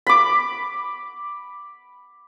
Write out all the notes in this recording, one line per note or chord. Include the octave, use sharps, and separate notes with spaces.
B5 D6